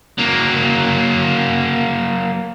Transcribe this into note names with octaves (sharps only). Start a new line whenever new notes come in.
F#3 A#3